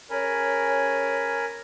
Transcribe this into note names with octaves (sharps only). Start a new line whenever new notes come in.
C#4 G#4 A#4 C#5 G#5 B5